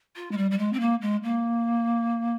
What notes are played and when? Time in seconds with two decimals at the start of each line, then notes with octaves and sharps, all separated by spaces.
0.16 F4
0.31 G#3
0.37 G3
0.51 G3
0.58 G#3
0.73 C4
0.80 A#3
1.02 G#3
1.23 A#3